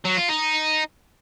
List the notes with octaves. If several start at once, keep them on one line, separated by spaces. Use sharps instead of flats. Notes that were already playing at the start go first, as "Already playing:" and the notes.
F#3
F4
D#4